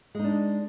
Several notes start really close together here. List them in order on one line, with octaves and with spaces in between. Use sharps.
G#3 D#4 D4